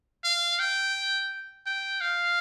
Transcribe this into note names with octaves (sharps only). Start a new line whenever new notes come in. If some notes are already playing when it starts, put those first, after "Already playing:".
F5
G5
G5
F5